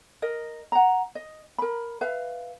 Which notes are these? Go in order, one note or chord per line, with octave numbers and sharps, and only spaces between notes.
A#4 D#5
F#5 A#5
D#5
A#4 B5
B4 E5 F5